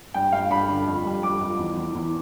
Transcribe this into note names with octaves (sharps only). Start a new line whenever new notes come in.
G2 G5
G2 F5
G2 B5
D3
F2
G3
G3 D6
F2
E2
E2
E2